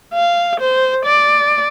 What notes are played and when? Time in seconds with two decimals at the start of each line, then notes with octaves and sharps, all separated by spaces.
0.13 F5
0.60 C5
1.05 D5